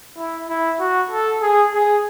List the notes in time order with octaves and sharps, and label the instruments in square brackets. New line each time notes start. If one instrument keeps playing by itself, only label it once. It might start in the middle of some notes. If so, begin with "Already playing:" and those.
[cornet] E4
E4
F#4
A4
G#4
G#4